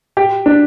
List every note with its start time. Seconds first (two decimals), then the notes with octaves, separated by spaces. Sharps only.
0.17 G4
0.46 D4